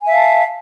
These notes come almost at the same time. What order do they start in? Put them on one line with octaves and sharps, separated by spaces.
G#5 E5 F5 A5